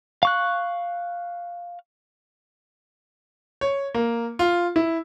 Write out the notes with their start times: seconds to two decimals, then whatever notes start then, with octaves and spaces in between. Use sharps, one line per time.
0.23 F5 C#6 F#6
3.61 C#5
3.94 A#3
4.39 F4
4.76 E4